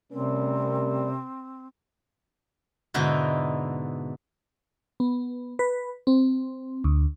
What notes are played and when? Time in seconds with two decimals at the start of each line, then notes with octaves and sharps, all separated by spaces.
0.12 C3 G3 A3 C4 C#4 A#4
2.94 G#2 B2 D3 D#4 E4
5.00 B3
5.59 B4
6.07 C4
6.84 D2